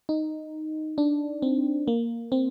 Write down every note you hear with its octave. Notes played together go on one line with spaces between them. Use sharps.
D#4
D4
C4
A#3
C4